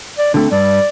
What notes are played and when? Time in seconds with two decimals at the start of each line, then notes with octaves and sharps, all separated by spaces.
0.18 D5
0.34 D3 A3 C4
0.52 G2 D5